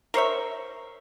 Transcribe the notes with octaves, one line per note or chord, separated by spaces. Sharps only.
A#4 C5 C#5 E5